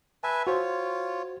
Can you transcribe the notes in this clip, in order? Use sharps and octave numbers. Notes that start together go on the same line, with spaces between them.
B4 E5 G#5 A5
F4 F#4 C5 C#5